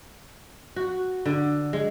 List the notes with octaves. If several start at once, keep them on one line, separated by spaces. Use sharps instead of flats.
F#4
D3
G#3